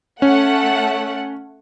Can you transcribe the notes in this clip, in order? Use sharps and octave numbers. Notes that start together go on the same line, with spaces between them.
A3 C#4 F#5